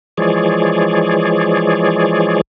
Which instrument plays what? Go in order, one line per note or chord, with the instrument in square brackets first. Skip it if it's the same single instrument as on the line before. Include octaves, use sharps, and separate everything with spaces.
[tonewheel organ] E3 F3 G#3 G#4 C#5 D5